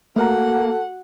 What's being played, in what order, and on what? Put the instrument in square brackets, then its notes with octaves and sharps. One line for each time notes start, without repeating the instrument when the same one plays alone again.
[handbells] A3 A#4 A#5 [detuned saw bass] A#3 [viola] F#4 F#5 [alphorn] A4